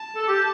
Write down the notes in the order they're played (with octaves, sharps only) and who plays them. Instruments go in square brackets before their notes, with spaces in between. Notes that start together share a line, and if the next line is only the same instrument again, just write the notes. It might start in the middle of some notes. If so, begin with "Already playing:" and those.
Already playing: [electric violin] A5
[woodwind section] A4
G4